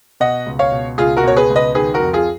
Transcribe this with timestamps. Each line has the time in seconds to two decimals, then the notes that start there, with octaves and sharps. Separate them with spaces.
0.20 B2 D#5 F#5
0.46 C#2
0.59 C#5 F5
0.72 B2
0.98 C#2 F4 G#4
1.17 F#4 A#4
1.23 B2 C#5
1.36 G#4 B4
1.50 C#2
1.56 B4 D#5
1.75 D#3 G#4 B4
1.94 F#4 A#4
2.00 F2
2.13 F4 G#4